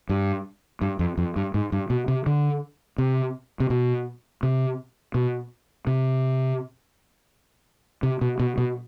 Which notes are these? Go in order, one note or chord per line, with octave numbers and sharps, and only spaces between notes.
G2
G2
F2
F2
G2
G#2
G2
B2
C3
D3
C3
C3
B2
C3
B2
C3
C3
B2
B2
B2